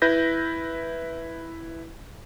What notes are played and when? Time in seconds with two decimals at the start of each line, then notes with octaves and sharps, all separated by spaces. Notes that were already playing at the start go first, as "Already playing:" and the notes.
0.02 E4 B4 G6 A#6